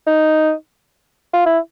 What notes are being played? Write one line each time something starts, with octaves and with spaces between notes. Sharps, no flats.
D#4
F4
E4